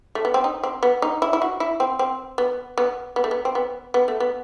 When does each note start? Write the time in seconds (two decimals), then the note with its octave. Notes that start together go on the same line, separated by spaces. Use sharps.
0.15 A3
0.25 B3
0.34 C4
0.44 D#4
0.63 C4
0.83 B3
1.02 D#4
1.22 E4
1.33 E4
1.42 F#4
1.60 E4
1.80 C4
1.99 C4
2.38 B3
2.78 B3
3.16 B3
3.24 A3
3.31 B3
3.45 C4
3.55 B3
3.94 B3
4.08 A3
4.20 B3